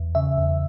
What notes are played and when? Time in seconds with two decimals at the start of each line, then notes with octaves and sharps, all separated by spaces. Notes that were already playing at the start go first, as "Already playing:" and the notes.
Already playing: E2
0.15 C#3 E5
0.38 E2